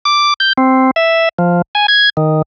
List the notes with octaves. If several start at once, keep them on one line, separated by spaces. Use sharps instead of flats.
D6
G6
C4
E5
F3
G#5
G#6
D#3